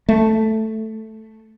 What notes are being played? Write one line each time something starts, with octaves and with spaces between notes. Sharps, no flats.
A3